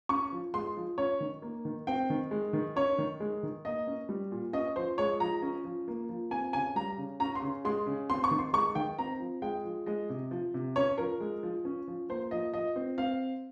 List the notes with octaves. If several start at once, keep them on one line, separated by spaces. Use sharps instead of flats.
C#4 C#6
F3
G#3 C6
F3
C#4 C#5
D#3
A#3
D#3
C4 G5
D#3
G#3
D#3
C#4 C#5
D#3
G#3
D#3
A#3 D#5
C#4
G3
A#2
C#4 D#5
F3 C5
G#3 C#5
F3 A#5
C#4
F3
A#3
F3
C4 G#5
C#3 G#5
G3 A#5
C#3
C#4 A#5
C6
C#3
G#3 C6
C#3
C4 C6
C#6
D#3
C6
G#3 C#6
D#3 G5
C4 A#5
F3
G#3 G5
F3
G#3 D#5
C3
F3
C3
C#4 C#5
F3 A#4
G#3
F3
C#4
F3
A#3 C5
F3 D#5
F3 D#5
C4
C4 F5